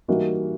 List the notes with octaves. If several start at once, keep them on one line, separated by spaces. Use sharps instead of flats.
E3 G3 A#3 D#4 F#4